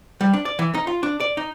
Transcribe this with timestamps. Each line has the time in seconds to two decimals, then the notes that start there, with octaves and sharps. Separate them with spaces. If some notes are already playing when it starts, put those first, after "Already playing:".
0.21 G3
0.34 D4
0.45 D5
0.59 E3
0.74 D#4
0.87 F4
1.03 D4
1.20 D5
1.37 D#4